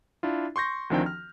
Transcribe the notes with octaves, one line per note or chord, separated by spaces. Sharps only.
D4 E4 F4
C6 C#6 G6 A#6
D2 D#3 F3 C4 D4 G5
F6